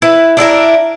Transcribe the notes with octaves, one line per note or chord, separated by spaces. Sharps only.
E4 B4
D4 E4 G4 A#4